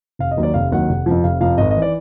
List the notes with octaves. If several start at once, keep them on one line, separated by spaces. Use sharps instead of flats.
F1 F5
D#5
D#2 D#3 F#3
D5
F1 F5
D#2 D#3 F#3 F#5
F1
F2 C3 F3
F1 F5
F2 C3 F3 F5
G#1 D#5
D#5
E3
D5